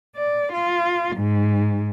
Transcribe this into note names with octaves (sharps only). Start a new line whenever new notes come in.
D5
F4
G#2